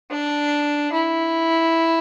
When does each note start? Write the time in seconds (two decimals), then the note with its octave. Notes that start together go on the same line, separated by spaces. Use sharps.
0.11 D4
0.93 E4